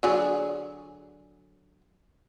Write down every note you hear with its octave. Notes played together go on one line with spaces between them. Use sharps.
D3 F#3 G#4